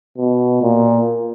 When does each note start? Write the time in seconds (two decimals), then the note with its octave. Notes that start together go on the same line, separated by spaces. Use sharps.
0.18 B2
0.62 A#2